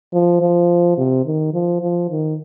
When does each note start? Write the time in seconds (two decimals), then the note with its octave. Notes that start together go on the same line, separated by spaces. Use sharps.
0.13 F3
0.41 F3
0.98 C3
1.26 D#3
1.53 F3
1.81 F3
2.10 D#3